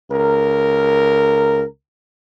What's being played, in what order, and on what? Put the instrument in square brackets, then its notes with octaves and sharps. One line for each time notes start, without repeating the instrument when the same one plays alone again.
[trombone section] C#2 A#4